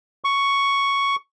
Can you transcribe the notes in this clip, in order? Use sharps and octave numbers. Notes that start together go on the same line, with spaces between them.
C#6